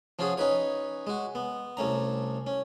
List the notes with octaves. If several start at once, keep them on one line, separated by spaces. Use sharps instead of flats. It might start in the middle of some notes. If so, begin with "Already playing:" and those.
F3 C#4 F4 F#4 G#4
C#4 D#4 B4 C#5
G#3 F#4
B3
C2 A3 C#4 A#5
C#4